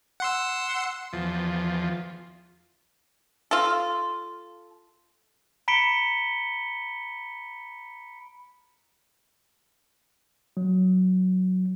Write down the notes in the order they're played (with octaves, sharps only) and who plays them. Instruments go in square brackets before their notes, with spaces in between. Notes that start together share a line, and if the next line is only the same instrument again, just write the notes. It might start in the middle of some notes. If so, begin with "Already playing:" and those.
[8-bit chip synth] F#5 C6 E6
[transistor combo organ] E2 F3
[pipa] F4 A4
[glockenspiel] A#5 B5 B6 C#7 D7 G7
[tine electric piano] F#3